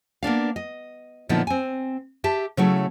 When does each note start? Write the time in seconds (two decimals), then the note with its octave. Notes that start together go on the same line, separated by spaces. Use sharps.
0.23 A#3 B3 D4 F5
0.56 D#5
1.29 A#2 D3 F3 B3 D#4 E4
1.47 C4 G#5
2.24 G4 E5 A5
2.57 C#3 F#3 A3 E4